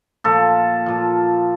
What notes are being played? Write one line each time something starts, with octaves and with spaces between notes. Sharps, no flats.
A#2 F3 A4
A#2 F3